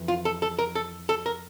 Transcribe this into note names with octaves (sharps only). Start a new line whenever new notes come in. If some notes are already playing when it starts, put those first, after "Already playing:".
Already playing: F2 E3
F4
A4
A4
A#4
A4
A4
A#4